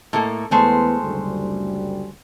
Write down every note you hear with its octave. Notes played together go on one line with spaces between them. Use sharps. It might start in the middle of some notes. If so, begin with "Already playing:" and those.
A2 A#3 A4
E2 G#3 A3 B3 C5
F#1 D2 G3